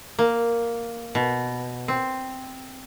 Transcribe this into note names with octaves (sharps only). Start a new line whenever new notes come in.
A#3
B2
C4